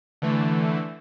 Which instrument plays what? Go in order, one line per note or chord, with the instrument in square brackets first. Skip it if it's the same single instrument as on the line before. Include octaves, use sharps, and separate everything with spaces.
[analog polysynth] D3 E3 A3